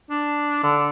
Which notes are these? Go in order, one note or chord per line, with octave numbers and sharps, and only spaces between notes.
D4
D3